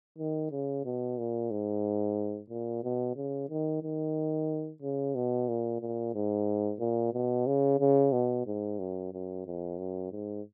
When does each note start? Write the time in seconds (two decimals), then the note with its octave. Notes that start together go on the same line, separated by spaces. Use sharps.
0.18 D#3
0.51 C#3
0.85 B2
1.18 A#2
1.51 G#2
2.50 A#2
2.83 B2
3.16 C#3
3.50 D#3
3.83 D#3
4.82 C#3
5.15 B2
5.48 A#2
5.80 A#2
6.14 G#2
6.80 A#2
7.13 B2
7.46 C#3
7.80 C#3
8.12 B2
8.46 G#2
8.79 F#2
9.13 F#2
9.46 F2
9.78 F#2
10.12 G#2